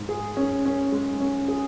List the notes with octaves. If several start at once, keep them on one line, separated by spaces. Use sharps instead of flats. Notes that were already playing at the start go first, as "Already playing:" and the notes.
Already playing: G#2 G#3
G#4
C#4
C#4
G#3
C#4
G#4